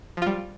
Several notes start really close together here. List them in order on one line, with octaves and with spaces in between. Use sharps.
F3 F4 G3